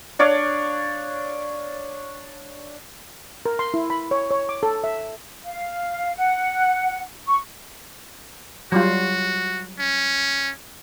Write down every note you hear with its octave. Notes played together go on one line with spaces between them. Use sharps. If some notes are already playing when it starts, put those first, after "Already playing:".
D4 C#5 D5 F5
A#4
C6
E4
B5
C#5
C#5
D6
A4
E5
F5
F#5
C#6
F#3 G3 F4 F#4
C#4